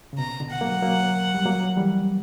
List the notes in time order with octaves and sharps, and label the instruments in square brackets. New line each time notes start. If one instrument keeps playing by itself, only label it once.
[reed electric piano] C#3
[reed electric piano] B2 [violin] A#5
[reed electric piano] B2 D3
[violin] F#5
[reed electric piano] F#3 A#3
F#3 A#3
G3
F#3 A#3
E3 G3